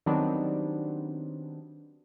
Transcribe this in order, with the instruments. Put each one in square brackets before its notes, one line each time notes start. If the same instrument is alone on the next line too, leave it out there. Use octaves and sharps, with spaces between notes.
[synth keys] D#3 F#3 G3 B3 C4 D4